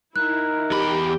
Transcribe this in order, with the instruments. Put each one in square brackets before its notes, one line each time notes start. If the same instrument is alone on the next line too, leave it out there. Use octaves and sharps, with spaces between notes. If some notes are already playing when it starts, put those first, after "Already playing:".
[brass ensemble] D#4 A#4 [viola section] E4 [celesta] F#6
[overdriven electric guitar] E2 B5 [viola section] G4